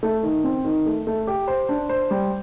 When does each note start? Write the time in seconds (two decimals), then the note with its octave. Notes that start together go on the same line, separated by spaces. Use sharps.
0.03 A3
0.23 D#3
0.44 C4
0.64 D#3
0.86 A3
1.07 A3
1.27 G4
1.48 C5
1.69 D4
1.89 C5
2.11 G3